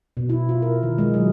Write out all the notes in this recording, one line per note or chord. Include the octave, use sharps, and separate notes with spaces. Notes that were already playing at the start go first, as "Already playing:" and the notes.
B2
E4
F4
A#4
D#3
G#3
F#3